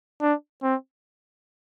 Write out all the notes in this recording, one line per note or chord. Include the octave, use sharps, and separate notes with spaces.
D4
C4